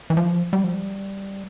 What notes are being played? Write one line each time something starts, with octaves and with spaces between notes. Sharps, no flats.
E3
F3
G3
F3
G3